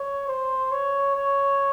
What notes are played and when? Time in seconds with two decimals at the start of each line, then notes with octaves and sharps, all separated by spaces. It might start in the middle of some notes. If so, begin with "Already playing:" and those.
Already playing: C#5
0.28 C5
0.72 C#5
1.16 C#5